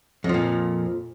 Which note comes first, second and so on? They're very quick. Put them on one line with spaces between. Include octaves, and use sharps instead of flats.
F2 F3 A#2